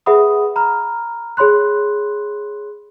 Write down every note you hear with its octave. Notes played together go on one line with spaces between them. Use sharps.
G#4 B4 E5 F#5 B5 D#6
A#5 B5 F6
G#4 C#5 B5 C6 F#6